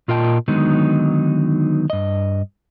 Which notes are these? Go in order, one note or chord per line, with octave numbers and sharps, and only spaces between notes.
A#2 F4 A#4 D#5 G5 A5
D3 D#3 F#3 G#3 B3 D#4
G2 D#5